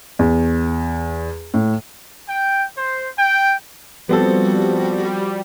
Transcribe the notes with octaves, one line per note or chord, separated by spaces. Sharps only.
E2
A2
G5
C5
G5
F3 G3 B3 C4 F#4 A4